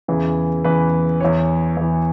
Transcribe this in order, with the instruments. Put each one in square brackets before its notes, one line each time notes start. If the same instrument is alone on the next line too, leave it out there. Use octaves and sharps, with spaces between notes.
[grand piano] E2 C#3 E3 G#4
E2 C#3 E3 B4
E2 E3 C#5
E2 E3